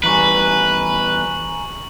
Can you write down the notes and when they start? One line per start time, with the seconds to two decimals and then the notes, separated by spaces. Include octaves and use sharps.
0.03 E2 G3 B4 G#5 A#5 C#6 F#7